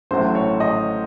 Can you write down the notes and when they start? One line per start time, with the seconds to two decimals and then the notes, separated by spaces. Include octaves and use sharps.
0.11 A1 A2 F#3 C5
0.35 C#5
0.60 D#5